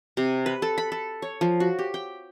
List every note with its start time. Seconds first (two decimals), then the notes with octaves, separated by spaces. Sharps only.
0.17 C3
0.46 B4
0.62 A4
0.78 B5
0.92 A4
1.22 C#5
1.41 F3
1.60 F#4
1.79 G4
1.94 G5